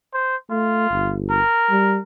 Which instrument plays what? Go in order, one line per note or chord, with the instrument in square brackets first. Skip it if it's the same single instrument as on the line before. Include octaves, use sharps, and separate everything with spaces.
[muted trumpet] C5
[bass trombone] A3 [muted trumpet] F4
[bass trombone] G1
[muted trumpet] A#4
[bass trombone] G3